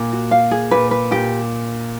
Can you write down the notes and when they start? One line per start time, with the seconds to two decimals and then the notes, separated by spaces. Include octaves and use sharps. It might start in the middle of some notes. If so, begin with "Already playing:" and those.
Already playing: A#2
0.12 F#4
0.31 F5
0.51 G#4
0.71 A#2 B4
0.91 B4
1.11 A#2 G4